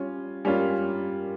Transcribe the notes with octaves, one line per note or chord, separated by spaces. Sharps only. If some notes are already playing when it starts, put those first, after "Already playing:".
Already playing: G3 C#4 F4
G3 A#3 C#4 F4